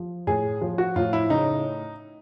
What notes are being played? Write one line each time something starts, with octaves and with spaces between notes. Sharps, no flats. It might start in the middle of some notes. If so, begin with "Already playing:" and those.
Already playing: F3
A2 G#4
F3
F#4
A2 F4
E4
C#3 D#4